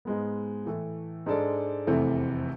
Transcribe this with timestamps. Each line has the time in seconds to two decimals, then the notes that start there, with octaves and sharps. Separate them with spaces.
0.05 G#2 G#3 B3
0.65 A2 E3 A3
1.26 G#2 G#3 D4 A4 D5
1.87 F1 E2 C3 E3 A3